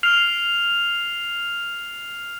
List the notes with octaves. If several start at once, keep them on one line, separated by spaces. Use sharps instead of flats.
F6 C7 F7